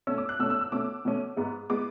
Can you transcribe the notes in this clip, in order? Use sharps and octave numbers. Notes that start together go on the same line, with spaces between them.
B2 A3 C#4 E6
D6
F#6
B2 A3 C#4 E6
E6
E6
B2 A3 C#4 D6
B2 A3 C#4
G#2 G#3 B3
G#3 B3 D6